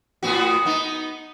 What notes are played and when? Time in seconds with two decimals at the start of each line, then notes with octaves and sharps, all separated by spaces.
0.23 A2 B3 F#4
0.65 B3 D#4